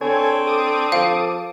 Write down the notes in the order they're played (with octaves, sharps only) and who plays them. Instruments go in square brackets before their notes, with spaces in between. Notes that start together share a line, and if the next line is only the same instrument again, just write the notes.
[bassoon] D3 [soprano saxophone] C4 [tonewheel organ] A4 C#5 G#5
[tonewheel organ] A4 D6 D#6
[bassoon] F3 [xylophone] F5